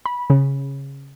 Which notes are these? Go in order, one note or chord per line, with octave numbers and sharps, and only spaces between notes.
B5
C#3